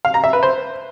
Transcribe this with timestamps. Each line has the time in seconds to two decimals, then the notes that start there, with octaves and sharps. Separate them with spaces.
0.05 F5
0.14 A#5
0.24 E5
0.33 B4
0.43 C5